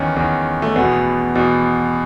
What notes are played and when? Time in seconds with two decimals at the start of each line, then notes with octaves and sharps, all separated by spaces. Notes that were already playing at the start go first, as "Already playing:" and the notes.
Already playing: E2 D#3 C#4
0.16 E2 D#3
0.62 A3
0.76 E2 B2 B3
1.35 E2 B2